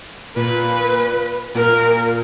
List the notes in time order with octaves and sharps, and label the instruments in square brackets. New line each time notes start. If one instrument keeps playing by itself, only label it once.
[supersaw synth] A#2 [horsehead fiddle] B4
[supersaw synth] A#2 [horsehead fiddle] A#4